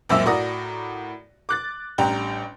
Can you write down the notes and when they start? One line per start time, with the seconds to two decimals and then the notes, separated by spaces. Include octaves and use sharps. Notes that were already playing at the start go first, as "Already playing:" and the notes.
0.09 C#2 F#2 A#2 C4 E5 E6
0.26 A2 F#4 A#4 D5 D#6 A#6
1.49 D6 F#6 A6
1.98 A1 G3 D4 G5 A#5